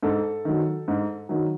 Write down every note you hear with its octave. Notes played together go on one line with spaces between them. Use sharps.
G#2 A4
D#3 F#3
G#2
D#3 F#3